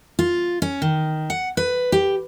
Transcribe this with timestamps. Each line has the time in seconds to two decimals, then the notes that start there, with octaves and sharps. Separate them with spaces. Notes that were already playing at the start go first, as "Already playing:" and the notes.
0.19 F4
0.62 C#4
0.82 D#3
1.30 F#5
1.57 B4
1.92 G4